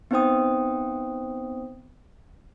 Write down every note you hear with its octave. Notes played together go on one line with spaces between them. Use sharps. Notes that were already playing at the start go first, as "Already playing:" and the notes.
B3 C4 D#4 C5 G5 D#6